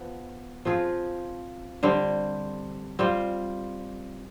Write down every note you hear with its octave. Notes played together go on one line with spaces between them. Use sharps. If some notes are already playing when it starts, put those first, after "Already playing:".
Already playing: F3 B3
F3 C4 F4 G#4
D3 G3 C4
G3 C4 F4 C5